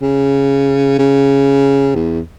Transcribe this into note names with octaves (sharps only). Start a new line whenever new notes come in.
C#3
C#3
E2